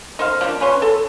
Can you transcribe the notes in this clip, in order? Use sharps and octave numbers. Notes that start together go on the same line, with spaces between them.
D#4 C5 F5
F3 A#3 D4
C#4 B4 C#5 C6
A4